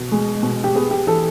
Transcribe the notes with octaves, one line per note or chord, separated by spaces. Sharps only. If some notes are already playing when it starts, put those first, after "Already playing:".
Already playing: B2
G#3
B2
G4
B3 G#4
G4
E3 A4